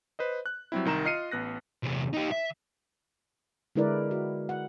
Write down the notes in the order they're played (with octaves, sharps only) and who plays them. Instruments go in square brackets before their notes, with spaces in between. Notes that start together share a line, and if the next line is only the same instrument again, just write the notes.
[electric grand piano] B4 C5 D#5
F#6
F#3 G3 C4 E4
C2 D#3 A#5 E7
F4 D#5 F6 C7 C#7 D#7
A1 B3 F#6 A#6
[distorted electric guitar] E2 C3
D#4 G4
E5
[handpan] D3 G#3 E4 A#4 B4 D5
F#4
F#5